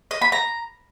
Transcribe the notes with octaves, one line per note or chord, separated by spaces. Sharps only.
D#5
B5
A#5